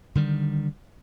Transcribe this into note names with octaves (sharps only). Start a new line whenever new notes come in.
D3 D#3 G3